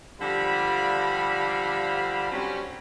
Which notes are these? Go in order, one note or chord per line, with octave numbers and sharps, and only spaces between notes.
D3 F3 G3 F5 B5
F#3 G3 C4 C#4